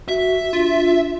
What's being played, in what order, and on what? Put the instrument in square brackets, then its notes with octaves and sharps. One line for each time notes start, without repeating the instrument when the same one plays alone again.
[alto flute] F#4 [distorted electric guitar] E5
[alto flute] D4 [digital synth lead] F4